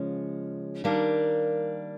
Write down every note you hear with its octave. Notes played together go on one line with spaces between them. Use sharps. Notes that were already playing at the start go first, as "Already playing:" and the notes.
Already playing: C#3 F3 G#3 C#4
D#3 G3 A#3 D4